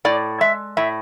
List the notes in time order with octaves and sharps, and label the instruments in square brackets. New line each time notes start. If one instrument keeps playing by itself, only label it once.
[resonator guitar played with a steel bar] A2 D5
G#3 E5
A2 E5